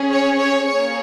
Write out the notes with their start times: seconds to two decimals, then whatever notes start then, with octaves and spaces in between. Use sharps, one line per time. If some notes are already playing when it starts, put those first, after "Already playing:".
Already playing: C#4 G#4
0.08 C#5
0.37 C#5
0.67 A#3 C#4 G#4 C#5